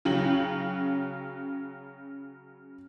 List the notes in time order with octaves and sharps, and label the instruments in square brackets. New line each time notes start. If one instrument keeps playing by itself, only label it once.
[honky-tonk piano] C#3 F#3 G5 F#7